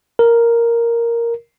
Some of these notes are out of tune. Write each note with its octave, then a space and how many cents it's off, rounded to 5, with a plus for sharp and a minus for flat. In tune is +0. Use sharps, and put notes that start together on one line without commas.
A#4 +0